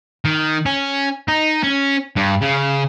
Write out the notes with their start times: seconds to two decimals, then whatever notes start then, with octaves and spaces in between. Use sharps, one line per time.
0.25 D#3
0.66 C#4
1.28 D#4
1.63 C#4
2.16 G2
2.41 C#3